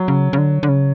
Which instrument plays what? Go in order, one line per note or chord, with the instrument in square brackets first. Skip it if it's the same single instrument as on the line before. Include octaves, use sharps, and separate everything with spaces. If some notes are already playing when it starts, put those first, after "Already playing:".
Already playing: [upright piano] F#3
[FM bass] C#3
C#3
D3
D3
C#3